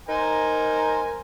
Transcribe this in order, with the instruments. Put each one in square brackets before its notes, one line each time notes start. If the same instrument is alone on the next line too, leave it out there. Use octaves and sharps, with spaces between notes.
[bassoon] D#4 [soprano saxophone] A#4 [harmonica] C5 G#5